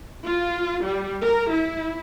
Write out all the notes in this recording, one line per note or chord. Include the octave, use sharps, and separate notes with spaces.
F4
G3
A#4
E4